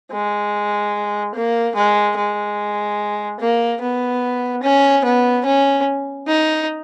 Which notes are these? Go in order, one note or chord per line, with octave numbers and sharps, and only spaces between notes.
G#3
A#3
G#3
G#3
A#3
B3
C#4
B3
C#4
D#4